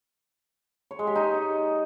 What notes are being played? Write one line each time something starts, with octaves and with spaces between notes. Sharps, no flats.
C#5
G#3
G4
D#4